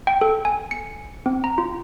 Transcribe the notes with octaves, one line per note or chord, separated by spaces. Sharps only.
G5
A4
G#5
C#7
C4
A#5
F4